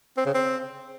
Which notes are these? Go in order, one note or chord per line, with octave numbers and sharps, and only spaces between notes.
C4
C#3
C4